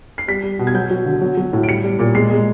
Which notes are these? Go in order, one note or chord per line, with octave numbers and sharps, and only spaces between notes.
C7
G3 B6
G3
B2
G#6
F#3 G6
F#3
D3
F#3
F#3
A2
D7
G3 C#7
G3
A#2
G#3 C7
G#3